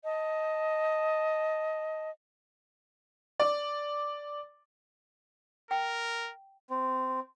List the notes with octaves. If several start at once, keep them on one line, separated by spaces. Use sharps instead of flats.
D#5 A5
D5
A#4 G5
C4